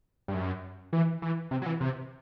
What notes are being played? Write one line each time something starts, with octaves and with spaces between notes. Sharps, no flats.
G2
F#2
E3
E3
C3
F#3
E3
C3